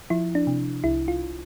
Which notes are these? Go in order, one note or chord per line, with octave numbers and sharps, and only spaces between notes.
F3 E4
D4
C3
C2 E4
F4